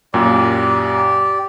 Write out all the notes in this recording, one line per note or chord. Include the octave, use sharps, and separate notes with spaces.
F#2 A#2 G4 D5